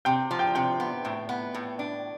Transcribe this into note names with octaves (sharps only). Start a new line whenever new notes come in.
C3 G5
F3
G5
C3 G5
B3
A2
B3
A2
D4